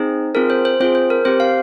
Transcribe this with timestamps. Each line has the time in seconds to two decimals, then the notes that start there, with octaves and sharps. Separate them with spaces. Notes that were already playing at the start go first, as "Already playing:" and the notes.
Already playing: C4 D#4 G#4 C5
0.35 C4 F4 G#4 A#4
0.50 C5
0.65 C5
0.80 C4 F4 G#4 C5
0.95 C5
1.10 A#4
1.25 C4 G4 C5
1.40 F5